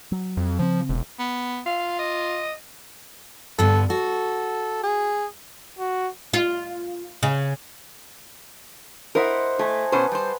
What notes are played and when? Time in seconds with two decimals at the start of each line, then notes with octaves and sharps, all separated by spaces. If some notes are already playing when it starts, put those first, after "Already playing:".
0.12 F#3
0.37 F2
0.59 C#3 F3 C4
0.89 E1
1.19 B3
1.66 F4 F5
1.99 D#5
3.59 G2 D3 B3 A4
3.90 F#4 A4
4.84 G#4
5.79 F#4
6.33 F4
7.23 C#3
9.15 E4 A#4 C5 D#5 F#5
9.59 A3 G#5 A5
9.92 B2 C#4 B4 C5
10.12 G3 C5